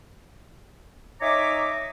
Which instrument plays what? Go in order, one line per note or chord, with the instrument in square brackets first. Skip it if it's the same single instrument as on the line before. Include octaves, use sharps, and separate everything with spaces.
[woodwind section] D#4 C#5 E5 G#5 A#5 D6